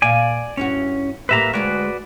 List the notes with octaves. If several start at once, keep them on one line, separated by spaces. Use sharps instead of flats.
A#2 D5 F5 G#5
G2 C#4 E4 F#4
A2 G3 A#3 B4 E5 A#5
D2 G#3 F#4 B4 C#5 D5